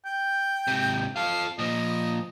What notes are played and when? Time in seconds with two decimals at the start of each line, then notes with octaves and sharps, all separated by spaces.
0.06 G5
0.68 G#2 C3
1.16 F4 A4 F5
1.59 A#2 F3 D#5